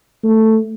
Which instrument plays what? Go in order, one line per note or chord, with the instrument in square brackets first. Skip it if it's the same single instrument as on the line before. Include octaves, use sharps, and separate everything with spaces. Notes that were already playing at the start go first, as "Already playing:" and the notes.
[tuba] A3